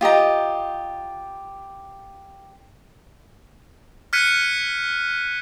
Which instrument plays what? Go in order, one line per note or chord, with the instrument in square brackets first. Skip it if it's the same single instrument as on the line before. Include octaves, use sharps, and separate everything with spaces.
[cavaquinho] F4 G4 D#5 A#5
[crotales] F6 F#6 G#6 B6 C#7 D#7